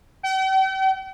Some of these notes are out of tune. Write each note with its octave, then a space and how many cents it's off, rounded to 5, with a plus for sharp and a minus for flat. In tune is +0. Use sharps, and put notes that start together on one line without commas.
G5 -45